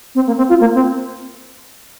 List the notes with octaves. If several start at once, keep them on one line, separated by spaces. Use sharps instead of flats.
C4
A#3
C4
F4
A#3
C4